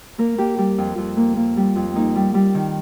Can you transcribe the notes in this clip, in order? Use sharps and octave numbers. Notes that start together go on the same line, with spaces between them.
A#3 A#4
A#3 G4
G3 G4
F2 F4
F2
A#3
A#3
G3
F2
A#3 D#4
G3
G3
D#3